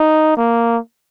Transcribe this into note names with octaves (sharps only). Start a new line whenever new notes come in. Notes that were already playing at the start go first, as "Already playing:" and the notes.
Already playing: D#4
A#3